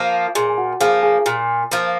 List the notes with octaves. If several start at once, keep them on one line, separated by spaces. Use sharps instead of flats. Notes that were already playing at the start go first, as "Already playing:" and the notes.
Already playing: F3 A#3
A#2 G#4 G#5
G#5
F#4 F#5
F3 A#3 G#4 G#5
G#4 G#5
A#2
F3 A#3